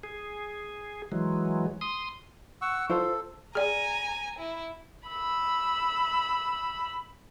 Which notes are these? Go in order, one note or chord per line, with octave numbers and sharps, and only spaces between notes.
G#4
E3 F#3 G#3
C6 D#6
F#5 C#6 E6
F4 A4 C5
G#4 D5 G#5 A#5
E4
B5 E6